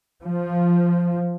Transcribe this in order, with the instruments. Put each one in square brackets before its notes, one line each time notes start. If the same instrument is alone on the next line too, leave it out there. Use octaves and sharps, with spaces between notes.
[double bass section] F3